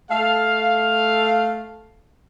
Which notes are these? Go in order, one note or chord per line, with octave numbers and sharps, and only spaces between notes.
A3 A4 F5